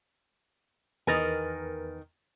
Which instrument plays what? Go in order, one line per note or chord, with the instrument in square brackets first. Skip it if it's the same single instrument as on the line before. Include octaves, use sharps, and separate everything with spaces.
[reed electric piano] E2 B4 A6 [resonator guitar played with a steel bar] D#3 A#4 G#5